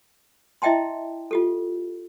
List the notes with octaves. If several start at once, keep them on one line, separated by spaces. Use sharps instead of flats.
E4 D#5 E5 G5 A5 C6
F4 G4 A4